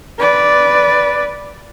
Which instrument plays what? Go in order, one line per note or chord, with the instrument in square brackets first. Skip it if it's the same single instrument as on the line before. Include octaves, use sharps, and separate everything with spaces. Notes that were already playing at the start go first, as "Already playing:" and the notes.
[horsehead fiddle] B4 D5